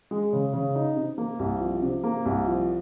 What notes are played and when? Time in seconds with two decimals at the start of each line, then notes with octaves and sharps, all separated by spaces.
0.11 G#3
0.33 C#3
0.53 C#3
0.75 D#4
0.96 C3
1.18 A#3
1.39 C2
1.61 F3
1.82 C3
2.04 A#3
2.26 C2
2.46 F3